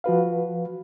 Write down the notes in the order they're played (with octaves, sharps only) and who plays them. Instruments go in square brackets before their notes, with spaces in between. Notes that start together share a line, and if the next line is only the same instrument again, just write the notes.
[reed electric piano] F3 F#4 B4 F5